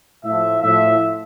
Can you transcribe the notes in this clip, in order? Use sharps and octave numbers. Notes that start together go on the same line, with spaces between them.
A2 F3 E5
A2 F3 E5